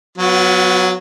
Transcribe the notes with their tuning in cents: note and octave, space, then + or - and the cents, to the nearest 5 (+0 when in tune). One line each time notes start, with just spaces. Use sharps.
F#3 +0 B3 +15 F4 +40